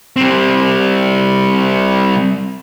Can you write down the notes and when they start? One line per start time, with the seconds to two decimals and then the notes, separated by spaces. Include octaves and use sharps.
0.16 G3 C4